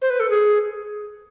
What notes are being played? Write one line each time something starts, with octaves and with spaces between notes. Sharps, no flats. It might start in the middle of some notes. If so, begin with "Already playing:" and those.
C5
B4
A4
G#4